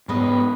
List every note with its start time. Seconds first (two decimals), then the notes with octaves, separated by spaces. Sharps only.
0.08 G#2 G#3 B3 B4 D#5